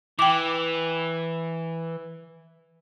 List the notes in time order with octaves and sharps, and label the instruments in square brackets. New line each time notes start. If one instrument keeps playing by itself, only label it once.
[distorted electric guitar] E3 [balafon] G5 D6